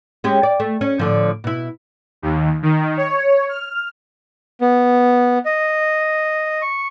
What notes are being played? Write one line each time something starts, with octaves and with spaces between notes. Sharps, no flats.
G#3 C#4 G4
D5
A3
C#4
A2 D3 F3
B2 E4
D#2
D#3
C#5
F6
B3
D#5
C#6